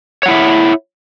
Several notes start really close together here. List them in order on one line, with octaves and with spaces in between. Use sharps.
C#5 F#5 E4 E5